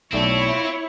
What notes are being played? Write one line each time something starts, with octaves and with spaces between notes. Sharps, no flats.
B1 A3 C4 E4 C#5 D5
F4